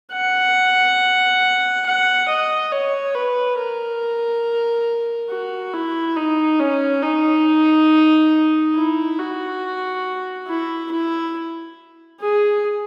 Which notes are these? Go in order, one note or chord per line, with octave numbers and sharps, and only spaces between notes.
F#5
F#5
D#5
C#5
B4
A#4
F#4
E4
D#4
C#4
D#4
E4
F#4
E4
E4
G#4